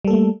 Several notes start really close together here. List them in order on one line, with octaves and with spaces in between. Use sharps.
G3 A4 A#3 A3